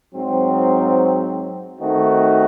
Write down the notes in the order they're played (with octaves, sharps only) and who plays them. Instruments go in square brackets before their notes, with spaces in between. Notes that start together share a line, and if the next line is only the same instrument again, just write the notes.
[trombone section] G#2 F#3 C4
D#3 A3 C4 D#4 F#4